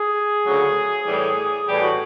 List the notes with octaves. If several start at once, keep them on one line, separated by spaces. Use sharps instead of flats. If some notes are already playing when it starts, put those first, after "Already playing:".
Already playing: G#4
D2 C#3 F#3
A2 E3 G3
A2 E3 G3 G4
F#4